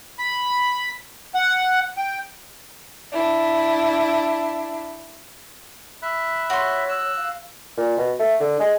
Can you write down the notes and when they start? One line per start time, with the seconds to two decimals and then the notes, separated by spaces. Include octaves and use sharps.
0.19 B5
1.35 F#5
1.97 G5
3.12 D4 E4
6.02 E5 B5 F#6
6.50 F#4 C#5 C6
6.89 E6 F#6
7.17 F5
7.77 A#2
7.97 B2
8.19 A3
8.40 D3
8.60 G#3